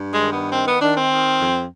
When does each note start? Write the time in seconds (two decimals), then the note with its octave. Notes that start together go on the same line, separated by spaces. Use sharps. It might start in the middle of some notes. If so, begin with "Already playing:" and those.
Already playing: G2
0.12 G#3
0.22 D#3
0.32 B3
0.51 D#3 C4
0.66 B3
0.81 D#3 D4
0.96 C4
1.11 D#3
1.39 F2